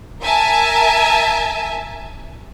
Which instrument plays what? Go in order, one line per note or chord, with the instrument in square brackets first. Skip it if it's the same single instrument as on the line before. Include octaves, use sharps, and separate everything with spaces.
[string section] A#4 E5 G#5 A5